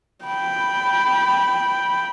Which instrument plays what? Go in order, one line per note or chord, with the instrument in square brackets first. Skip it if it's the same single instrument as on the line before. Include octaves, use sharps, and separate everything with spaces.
[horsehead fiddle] G5 B5